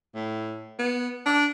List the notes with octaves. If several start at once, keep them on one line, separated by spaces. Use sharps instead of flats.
A2
B3
D4